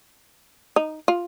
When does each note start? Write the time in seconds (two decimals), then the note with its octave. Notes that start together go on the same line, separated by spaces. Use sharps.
0.76 D#4
1.08 F4